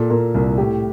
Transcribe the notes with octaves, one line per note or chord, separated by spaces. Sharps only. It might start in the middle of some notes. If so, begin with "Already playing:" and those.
Already playing: A#2 A4
A#2 A#4
C2 A#4
A2 G4